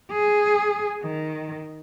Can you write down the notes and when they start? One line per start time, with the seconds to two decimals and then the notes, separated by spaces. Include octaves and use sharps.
0.12 G#4
1.02 D#3